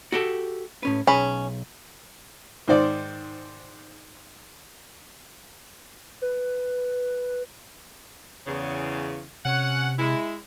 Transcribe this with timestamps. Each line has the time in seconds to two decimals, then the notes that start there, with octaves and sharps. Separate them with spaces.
0.12 F#4 G4 A4
0.83 A2 C#4 B4
1.07 B1 C#4 G#4 B5
2.68 G#2 D#3 C5 D5
6.22 B4
8.47 E2 C#3
9.45 C3 C#4 F#5
9.99 G#3 E4